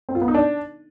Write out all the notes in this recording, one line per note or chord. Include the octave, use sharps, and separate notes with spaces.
C4
F4
B3
D#4
D4